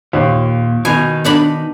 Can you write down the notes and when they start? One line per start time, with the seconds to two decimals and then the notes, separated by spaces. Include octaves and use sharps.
0.13 D#2 A#2
0.85 B2 D#3 D#4 G#5
1.24 B3 D4 B5